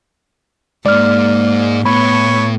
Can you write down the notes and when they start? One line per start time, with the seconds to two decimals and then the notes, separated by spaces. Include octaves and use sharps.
0.86 G#2 G#3 A#3 D5 F6
1.85 A2 B3 C#5 B5